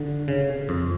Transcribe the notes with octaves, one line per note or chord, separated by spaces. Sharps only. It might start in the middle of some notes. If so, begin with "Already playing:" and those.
Already playing: D3
C#3
F2